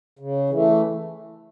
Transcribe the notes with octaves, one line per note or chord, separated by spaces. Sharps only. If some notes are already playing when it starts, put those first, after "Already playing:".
C#3
E3 A3